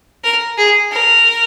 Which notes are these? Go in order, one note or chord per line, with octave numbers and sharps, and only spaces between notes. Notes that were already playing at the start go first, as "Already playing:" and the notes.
A#4
G#4
A#4